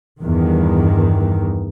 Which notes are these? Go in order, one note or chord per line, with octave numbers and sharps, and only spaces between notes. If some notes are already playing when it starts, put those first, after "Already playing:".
E2 G2 D#3